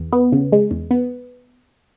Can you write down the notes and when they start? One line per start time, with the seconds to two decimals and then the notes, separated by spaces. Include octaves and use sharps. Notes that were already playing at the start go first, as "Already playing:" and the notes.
Already playing: E2
0.13 B3
0.32 C#3
0.52 G#3
0.71 E2
0.91 B3